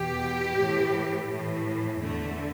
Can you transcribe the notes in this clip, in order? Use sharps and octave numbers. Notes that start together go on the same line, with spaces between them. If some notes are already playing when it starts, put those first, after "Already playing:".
Already playing: E2 B2 G4
A2 E3
A2 E3
E2 D3 A3